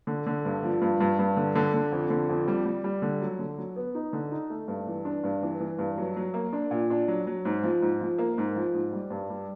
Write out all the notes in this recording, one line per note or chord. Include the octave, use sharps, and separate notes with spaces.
D3
D3
G2
F3
G2
G2
G2
D3
D3
D3
F2
D3
F2
G3
G3
G3
D3
F#3
D3
F#3
B3
D#4
D3
D#4
A3
G2
E3
D4
G2
E3
E3
G2
F#3
F#3
A#3
D4
A#2
D4
F#3
F#3
G#2
F3
G#2
F3
A#3
G#2
F3
G#2
G3
G2
G3